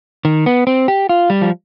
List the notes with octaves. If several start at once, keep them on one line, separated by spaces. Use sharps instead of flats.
D#3
B3
C4
G4
F4
G3
F3